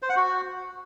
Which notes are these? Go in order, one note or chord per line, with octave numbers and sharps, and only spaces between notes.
C5
F#5
F#4